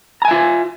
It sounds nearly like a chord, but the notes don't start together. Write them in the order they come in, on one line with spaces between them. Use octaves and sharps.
A#5 G#5 E5 F4